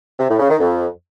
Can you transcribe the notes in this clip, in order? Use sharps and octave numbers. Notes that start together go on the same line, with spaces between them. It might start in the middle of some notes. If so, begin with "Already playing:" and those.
C3
A2
C#3
D#3
F2